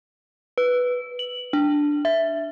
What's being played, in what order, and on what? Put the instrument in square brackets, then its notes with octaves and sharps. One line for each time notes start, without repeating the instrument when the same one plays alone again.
[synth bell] B4
F#7
D4
E5